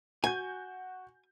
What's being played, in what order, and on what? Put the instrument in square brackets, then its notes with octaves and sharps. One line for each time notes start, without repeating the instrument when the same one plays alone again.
[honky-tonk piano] F#4 G6 [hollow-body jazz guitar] G#5